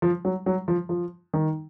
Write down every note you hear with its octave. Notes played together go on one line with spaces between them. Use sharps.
F3
F#3
F#3
F3
F3
D#3